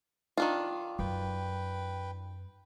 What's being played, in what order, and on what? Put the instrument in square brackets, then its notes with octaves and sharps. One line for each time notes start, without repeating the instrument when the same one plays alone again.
[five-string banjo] D#3 D4 F4
[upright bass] F#2 [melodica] B4 G5